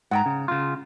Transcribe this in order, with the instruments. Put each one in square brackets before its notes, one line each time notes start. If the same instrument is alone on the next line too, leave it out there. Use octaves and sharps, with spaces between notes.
[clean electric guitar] G#2 [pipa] F#5 G5 A#5
[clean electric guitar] C#3
C#3 F4